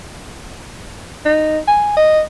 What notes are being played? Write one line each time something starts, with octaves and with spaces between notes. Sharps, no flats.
D#4
G#5
D#5